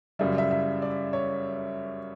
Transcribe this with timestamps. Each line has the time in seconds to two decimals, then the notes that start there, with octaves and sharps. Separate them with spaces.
0.19 F#2 C#3 G3 E5
0.38 E5
0.51 E5
0.82 D5
1.13 C#5